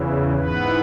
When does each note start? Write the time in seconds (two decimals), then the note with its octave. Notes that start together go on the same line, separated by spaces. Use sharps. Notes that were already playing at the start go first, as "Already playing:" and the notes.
Already playing: E2 C#3 E3
0.35 G#2 E3 B3 B4